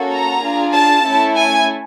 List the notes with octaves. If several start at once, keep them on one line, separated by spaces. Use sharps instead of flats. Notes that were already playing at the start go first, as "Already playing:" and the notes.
Already playing: A#3 C#4 F#4 A4
A#5
D4 F4 G#4
A5
A3 C#4 E4 A4
G#5